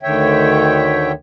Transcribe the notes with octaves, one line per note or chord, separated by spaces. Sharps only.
D2 D3 D#3 C#5 E5 G5